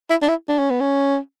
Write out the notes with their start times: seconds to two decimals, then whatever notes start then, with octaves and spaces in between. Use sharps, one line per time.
0.10 E4
0.22 D4
0.29 E4
0.49 D4
0.59 C#4
0.71 B3
0.81 C#4